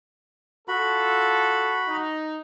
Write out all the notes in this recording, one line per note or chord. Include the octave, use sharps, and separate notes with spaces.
F4 F#4 A4 B5
D#4